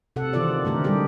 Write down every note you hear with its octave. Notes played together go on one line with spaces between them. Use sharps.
C3 A4 F#5
D#3 E3 C4 F4 A4 D5
D3 A3 G4 A#4
G3 G#3 D4 G4 G#4